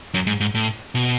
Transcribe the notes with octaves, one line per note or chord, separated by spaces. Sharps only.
F#2
G#2
G#2
A2
B2